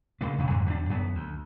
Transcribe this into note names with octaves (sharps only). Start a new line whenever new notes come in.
D2 C#3 G#3 A#3
E1 C#3 E3
F2 G#2 D3
E2 D4
F#2 F#3 A#3 B3
D2